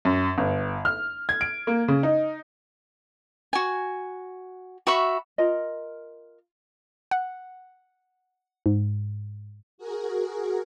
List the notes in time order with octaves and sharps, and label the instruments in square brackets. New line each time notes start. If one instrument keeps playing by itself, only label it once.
[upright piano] F#2
G1
F6
G#6
D7
A#3
C#3
D#4
[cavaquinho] F#4 G#5
F#4 E5 B5 C#6
[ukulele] F4 A#4 D#5
[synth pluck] F#5
G#2
[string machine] F#4 G#4 A#4